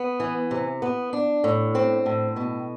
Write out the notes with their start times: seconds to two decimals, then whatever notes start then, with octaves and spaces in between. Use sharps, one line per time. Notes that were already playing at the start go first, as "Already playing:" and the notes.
Already playing: B3
0.20 E3
0.51 C3
0.82 B3
1.13 D4
1.44 A2
1.75 C4
2.06 A2
2.36 B2